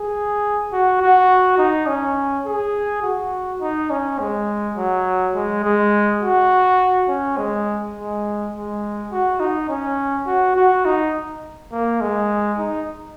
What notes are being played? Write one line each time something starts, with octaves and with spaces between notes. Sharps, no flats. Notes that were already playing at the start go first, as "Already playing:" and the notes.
Already playing: G#4
F#4
F#4
D#4
C#4
G#4
F#4
D#4
C#4
G#3
F#3
G#3
G#3
F#4
C#4
G#3
G#3
G#3
F#4
D#4
C#4
F#4
F#4
D#4
A#3
G#3
D#4